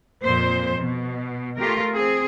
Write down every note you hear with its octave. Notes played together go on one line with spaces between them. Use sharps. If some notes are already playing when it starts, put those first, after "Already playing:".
F2 A#2 C5
B2
A3 F4 G4 A#4
C4 G#4